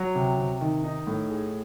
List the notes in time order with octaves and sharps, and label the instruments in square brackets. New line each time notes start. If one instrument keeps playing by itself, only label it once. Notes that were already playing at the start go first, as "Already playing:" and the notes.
Already playing: [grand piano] F#3
C3
C3
D#3
D#4
A2
G#4